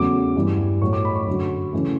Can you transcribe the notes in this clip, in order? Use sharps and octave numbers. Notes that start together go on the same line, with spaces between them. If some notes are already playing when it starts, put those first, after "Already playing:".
Already playing: E2 C#3 F#3 A3 D6
G2 E3 G3
A2 F#3 A3 C#6
D6
B5
C#6
F#2 D3 F#3
C#3 E3 A3